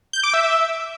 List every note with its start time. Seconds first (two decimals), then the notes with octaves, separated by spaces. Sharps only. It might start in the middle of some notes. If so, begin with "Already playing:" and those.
0.13 G6
0.23 D6
0.34 E5